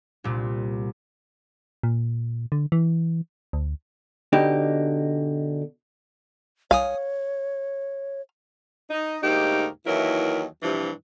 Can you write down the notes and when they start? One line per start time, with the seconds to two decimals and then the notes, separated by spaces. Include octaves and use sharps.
0.24 C2 A#2
1.83 A#2
2.52 D3
2.72 E3
3.53 D2
4.33 B2 D3 D#4 G4
6.71 C2 C#5 F5 G#5 D#6
8.90 D#4
9.23 D2 G#2 A#3 D#4 G4
9.86 D#2 E3 F#3 E4 A#4
10.62 G2 C3 E3 F3